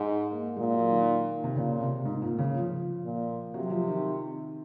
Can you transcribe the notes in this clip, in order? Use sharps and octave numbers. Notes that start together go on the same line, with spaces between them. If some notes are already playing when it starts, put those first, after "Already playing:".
Already playing: G#2
A#3
A#2 G#3
F#3
D#3
C3
A#2 C#3
C3
G#2
A#2
C#3
F3
A#2
C3 F#3
F3
D#3